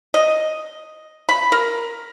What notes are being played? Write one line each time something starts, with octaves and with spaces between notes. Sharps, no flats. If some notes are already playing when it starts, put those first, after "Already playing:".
D#5
B5
A#4